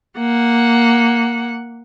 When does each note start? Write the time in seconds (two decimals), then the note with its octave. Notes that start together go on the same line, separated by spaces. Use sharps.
0.18 A#3 F#5